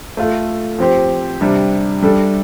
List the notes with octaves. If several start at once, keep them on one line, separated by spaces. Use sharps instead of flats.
A3 F4 A4
F3 C4 G4 C5
C3 G3 D4
G3 D4 A4